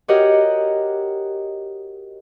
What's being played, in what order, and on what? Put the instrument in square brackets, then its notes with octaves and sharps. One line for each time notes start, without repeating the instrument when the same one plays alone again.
[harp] F#4 G4 A#4 C#5 D#5 F#5